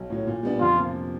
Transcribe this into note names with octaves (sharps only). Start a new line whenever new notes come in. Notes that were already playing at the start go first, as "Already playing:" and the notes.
Already playing: B1
A2 F#3
A#2
G3 B3 D4
F2 F4
C3 F3 A#3